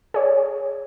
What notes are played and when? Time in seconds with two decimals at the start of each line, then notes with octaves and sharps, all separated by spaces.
0.14 G#4 C#5 D5